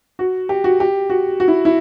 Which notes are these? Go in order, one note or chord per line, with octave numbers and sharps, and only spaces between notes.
F#4
G4
F#4
G4
F#4
F#4
E4
E4